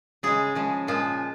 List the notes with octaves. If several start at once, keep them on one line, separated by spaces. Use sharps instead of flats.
C#3 G#3 G#4
C#3 F3 G#3
A#2 F3 G#3 F4